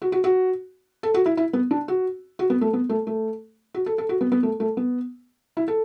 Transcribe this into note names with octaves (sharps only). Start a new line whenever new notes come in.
F#4
F#4
F#4
A4
F#4
E4
E4
B3
D4
F#4
F#4
B3
A3
B3
A3
A3
F#4
A4
A4
F#4
B3
B3
A3
A3
B3
E4
A4